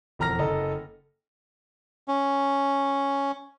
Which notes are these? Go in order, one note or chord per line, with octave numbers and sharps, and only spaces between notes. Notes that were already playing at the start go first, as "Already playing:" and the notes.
E1 F2 A#5 F6 A#6
F#1 A4 D#5 A#5
C#4